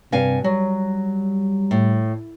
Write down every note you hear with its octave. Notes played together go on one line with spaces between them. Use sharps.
G2 C3 F5 G#5
F#3 G3
A2